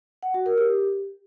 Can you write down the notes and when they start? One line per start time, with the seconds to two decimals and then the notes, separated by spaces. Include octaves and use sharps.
0.23 F#5
0.34 F#4
0.46 A#4
0.58 G4